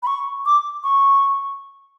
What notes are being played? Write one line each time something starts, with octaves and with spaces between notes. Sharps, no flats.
B5
C#6
D6
C#6